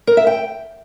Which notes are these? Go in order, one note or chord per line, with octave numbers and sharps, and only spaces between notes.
A#4
E5
G5